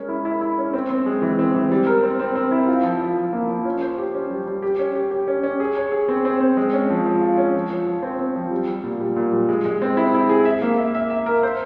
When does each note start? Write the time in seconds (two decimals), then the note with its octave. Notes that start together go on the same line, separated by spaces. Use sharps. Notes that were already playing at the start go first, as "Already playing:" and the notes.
Already playing: G#3 C#4 A#4
0.09 E4
0.25 E4
0.41 E4
0.58 C#4
0.73 C4
0.90 C4
1.06 G#3
1.22 E3
1.39 C4
1.54 E3
1.72 G3
1.87 A#4
2.03 C4
2.19 C4
2.35 C4
2.51 E4
2.68 F4
2.84 F3
3.01 F3
3.17 F3
3.33 A#3
3.49 F3
3.65 C#4
3.81 C5
3.98 G4
4.14 C#4
4.30 G3
4.47 G3
4.62 G4
4.79 C#4
4.95 G4
5.11 G4
5.28 C#4
5.43 C#4
5.60 G#4
5.77 C#5
5.92 G#4
6.09 C4
6.25 C4
6.41 C4
6.57 G#3
6.73 C#4
6.90 F3
7.06 F3
7.21 F4
7.38 C#4
7.55 F3
7.70 F3
7.87 F3
8.03 C4
8.19 C4
8.36 F3
8.51 G3
8.68 G3
8.84 A#2
9.00 G3
9.16 A#2
9.32 G3
9.49 G#3
9.65 G#3
9.82 C4
9.97 E4
10.14 E4
10.29 G#4
10.45 E5
10.62 A#3
10.78 E5
10.95 E5
11.10 E5
11.26 A#4
11.43 C5